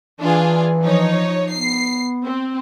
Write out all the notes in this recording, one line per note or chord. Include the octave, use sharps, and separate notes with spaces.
E3 D4 F4 G#4
F3 D#4 C#5
B3 C7
C4